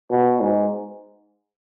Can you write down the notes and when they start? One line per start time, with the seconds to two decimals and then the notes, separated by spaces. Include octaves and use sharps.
0.11 B2
0.40 G#2